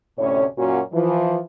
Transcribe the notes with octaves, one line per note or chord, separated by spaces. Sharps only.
D2 A2 C3 C#4 C#5
F#2 A#2 C#4 F#4
E3 F3